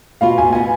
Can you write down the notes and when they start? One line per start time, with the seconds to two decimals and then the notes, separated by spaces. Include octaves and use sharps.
0.21 B2 B3 F4 F5
0.38 G#5
0.53 B2 B3 F4 G#5